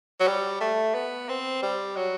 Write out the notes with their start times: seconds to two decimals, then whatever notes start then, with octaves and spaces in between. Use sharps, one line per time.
0.20 F#3
0.27 G3
0.61 A3
0.95 B3
1.29 C4
1.63 G3
1.96 F#3